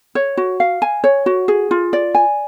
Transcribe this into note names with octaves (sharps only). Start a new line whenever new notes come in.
C#5
F#4
F5
G#5
C#5
F#4
G#4
F4
D5
G#5